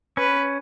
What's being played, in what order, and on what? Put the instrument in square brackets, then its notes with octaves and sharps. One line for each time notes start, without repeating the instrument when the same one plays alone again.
[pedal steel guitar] C#4 [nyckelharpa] B4